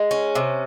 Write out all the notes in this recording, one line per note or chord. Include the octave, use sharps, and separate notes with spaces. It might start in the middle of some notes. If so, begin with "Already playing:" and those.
Already playing: G#3
C#4
C3